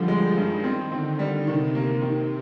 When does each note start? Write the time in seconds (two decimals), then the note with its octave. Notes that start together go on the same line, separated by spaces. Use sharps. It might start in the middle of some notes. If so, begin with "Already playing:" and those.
Already playing: D3 F3 G3
0.08 G#3
0.35 G2 D#3
0.64 C4
0.92 D3 C4
1.19 G3
1.47 C3 D#3
1.75 A#3
2.02 C3 D#3